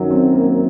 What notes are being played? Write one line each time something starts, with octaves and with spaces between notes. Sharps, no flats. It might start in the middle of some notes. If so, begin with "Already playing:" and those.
Already playing: F#2 D#3 F#3
C4
A#3